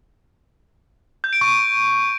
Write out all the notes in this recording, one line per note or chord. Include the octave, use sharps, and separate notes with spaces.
G6
D7
C#6